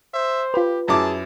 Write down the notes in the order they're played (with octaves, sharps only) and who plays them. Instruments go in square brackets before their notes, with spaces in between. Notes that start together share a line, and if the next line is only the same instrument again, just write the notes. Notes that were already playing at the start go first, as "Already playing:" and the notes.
[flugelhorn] C5 [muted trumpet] E5
[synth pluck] F4 B4 [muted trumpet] G4
[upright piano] F#2 E4 D6 [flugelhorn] G#4 [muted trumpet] A5